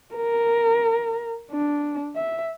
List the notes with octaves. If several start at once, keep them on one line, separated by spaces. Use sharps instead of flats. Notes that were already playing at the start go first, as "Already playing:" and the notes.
A#4
D4
E5